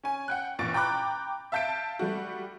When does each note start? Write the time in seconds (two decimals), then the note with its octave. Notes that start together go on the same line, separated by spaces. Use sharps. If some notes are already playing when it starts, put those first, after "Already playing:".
0.04 C#4 G#5
0.28 F#5 G5 F#6
0.59 A1 A#2 C#6 A6 D7
0.74 G5 A#5 B5 D6 F#6
1.52 E5 F5 A5 G6 B6 D7
1.99 G3 A3 F#4